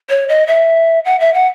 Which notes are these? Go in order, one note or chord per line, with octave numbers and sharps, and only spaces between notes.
C#5
D#5
E5
F#5
E5
F#5